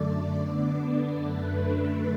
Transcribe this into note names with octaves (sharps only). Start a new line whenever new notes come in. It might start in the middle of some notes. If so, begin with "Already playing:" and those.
Already playing: F#2 D3 A3 D5
D3 B3 D4
F#2 D3 A3 D4 B4